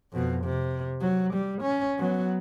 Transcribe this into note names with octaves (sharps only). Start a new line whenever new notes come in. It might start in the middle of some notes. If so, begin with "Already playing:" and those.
F2 B2
C3
F#3
G3
C#4
F#3 B3